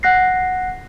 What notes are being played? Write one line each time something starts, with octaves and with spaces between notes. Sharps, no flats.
F#5 F#6 A#6 C7